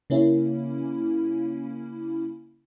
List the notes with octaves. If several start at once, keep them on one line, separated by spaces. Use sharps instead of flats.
C#3 A#3 C#4 E4